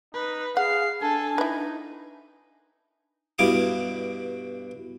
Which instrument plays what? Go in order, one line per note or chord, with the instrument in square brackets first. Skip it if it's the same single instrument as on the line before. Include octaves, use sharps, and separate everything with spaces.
[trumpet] D#4 [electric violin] B4
[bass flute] G#4 [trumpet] F5 [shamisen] F#5 [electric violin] C7
[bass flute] D4 [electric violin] A4 A5 [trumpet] G#5
[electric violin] D#4 [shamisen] E4 B4
[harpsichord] G2 B2 E4 F5 D6 D#6